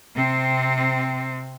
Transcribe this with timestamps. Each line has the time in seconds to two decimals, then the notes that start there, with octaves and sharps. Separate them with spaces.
0.15 C3 C4